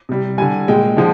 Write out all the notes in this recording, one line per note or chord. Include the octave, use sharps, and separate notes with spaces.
C3 G3
D3 G3 G#5
A#2 G#3 G5
D3 F3 G#3